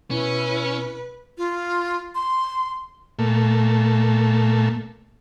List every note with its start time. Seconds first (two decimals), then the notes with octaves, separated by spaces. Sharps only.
0.11 B2 C#4 E4 B4
1.38 F4
2.15 C6
3.19 A#2 A3